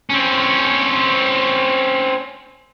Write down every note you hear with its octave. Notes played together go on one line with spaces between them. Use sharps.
C4 C#4